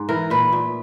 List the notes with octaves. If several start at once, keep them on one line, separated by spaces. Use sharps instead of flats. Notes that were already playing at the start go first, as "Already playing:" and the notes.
Already playing: G#2
E3 A#4
A#2 B4
A#2